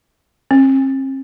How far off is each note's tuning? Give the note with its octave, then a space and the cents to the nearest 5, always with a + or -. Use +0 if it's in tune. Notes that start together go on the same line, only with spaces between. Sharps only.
C4 +45